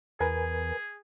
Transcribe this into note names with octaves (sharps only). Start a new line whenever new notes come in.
E2 G#4 A#4 B4 G#5